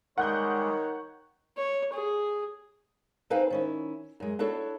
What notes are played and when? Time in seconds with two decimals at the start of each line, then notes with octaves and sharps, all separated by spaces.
0.18 D#3 G3 G#3 C#5 F#5 F#6 G6
1.57 C#5
1.93 G#4
3.30 C4 D#4 B4 C5 F5 G#5
3.50 D#3 C#4 E4
4.20 F#2 G#3
4.39 D4 E4 F#4 A4 C#5